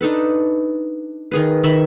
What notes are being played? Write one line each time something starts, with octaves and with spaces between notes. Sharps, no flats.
D4 D#4 A4 B4
D#3 G#4 B4
D#3 E5 B5